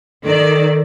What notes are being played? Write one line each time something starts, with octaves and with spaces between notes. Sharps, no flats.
D#3 A4 D5